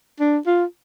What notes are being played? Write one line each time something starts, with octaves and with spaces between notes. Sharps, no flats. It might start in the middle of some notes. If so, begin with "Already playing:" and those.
D4
F4